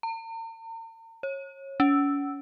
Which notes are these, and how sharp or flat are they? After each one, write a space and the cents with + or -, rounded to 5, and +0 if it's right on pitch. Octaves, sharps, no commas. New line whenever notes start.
A#5 -45
C#5 -25
C#4 +35